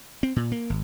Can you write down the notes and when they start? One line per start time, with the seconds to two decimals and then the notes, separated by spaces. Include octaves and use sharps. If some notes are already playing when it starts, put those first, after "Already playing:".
0.23 C4
0.36 A#2
0.52 A#3
0.70 G#1